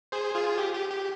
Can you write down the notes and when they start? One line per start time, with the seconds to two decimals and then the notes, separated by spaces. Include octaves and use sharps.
0.12 G#4 C5
0.35 F4 G#4
0.58 G4
0.74 G4
0.91 G4